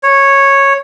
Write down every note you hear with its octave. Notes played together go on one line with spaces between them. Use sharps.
C#5